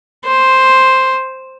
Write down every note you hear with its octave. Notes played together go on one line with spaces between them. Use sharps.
C5